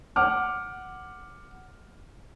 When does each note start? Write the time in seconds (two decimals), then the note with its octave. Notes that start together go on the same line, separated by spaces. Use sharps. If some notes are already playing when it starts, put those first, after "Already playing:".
0.16 F#5 D6 F6